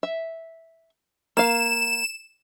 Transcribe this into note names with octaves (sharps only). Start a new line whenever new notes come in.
E5
A#3 F5 E7